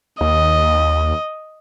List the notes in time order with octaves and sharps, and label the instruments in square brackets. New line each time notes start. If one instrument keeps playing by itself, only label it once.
[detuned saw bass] D#2 [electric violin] D#5